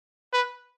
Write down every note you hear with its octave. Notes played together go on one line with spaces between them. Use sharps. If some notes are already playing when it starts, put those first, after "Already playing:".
B4